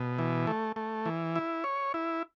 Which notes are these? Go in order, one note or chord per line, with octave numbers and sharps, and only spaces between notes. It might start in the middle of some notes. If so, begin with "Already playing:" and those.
Already playing: B2
E3
A3
A3
E3
E4
C#5
E4